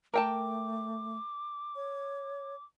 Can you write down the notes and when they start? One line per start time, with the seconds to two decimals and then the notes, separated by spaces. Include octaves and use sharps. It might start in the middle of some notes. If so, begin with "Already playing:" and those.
0.14 A3 A#4 G5 A5 D6
1.76 C#5